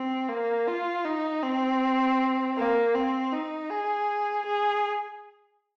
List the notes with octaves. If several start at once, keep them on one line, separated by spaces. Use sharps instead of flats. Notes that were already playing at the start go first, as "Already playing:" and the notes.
Already playing: C4
A#3
F4
D#4
C4
A#3
C4
D#4
G#4
G#4